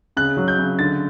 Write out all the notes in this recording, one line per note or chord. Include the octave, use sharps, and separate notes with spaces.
C#3 F#6
F#3
G6
C#3
D3 A6